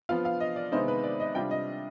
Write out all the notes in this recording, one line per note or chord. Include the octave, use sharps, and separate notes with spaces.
F3 B3 F4 F5
F5
D#5
D5
C3 D#3 G#3 B3 D#4 C5
B4
D5
D#5
C3 G3 D4 F4 G5
D#5